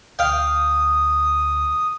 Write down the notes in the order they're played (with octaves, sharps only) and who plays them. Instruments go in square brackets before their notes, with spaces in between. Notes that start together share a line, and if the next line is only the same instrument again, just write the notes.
[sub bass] D2 [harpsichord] F5 G5 [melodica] D#6